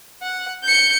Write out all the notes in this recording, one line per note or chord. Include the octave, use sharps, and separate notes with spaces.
F#5
G6 C#7